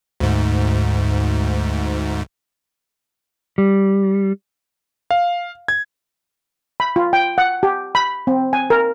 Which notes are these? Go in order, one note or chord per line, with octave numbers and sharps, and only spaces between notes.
D2 G#2
G3
F5
G#6
B5
F4
G5
F#5
G4
B5
C4
G#5
A#4